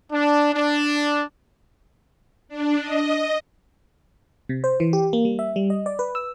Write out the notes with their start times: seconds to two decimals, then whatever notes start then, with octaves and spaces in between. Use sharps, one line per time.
0.11 D4
0.52 D4
2.49 D4
2.80 D#5
4.49 C3
4.64 C5
4.80 E3
4.93 G4
5.13 A#3
5.25 G3
5.39 E5
5.56 G3
5.70 D#5
5.86 D5
5.99 B4
6.15 E6